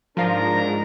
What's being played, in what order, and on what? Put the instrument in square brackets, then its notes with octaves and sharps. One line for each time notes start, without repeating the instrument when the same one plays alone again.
[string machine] G#2 [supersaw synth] F3 F4 [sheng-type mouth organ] D4 A#4 [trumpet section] A#5